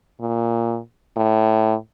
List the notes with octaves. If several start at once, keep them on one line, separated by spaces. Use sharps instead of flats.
A#2
A2